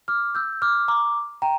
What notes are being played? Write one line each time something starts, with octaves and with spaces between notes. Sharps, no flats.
D6 F6
E6 G6
D6 F6
A#5 D6
G5 A#5